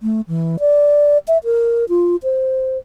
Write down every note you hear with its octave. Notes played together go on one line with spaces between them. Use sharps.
A3
E3
D5
E5
A#4
F4
C5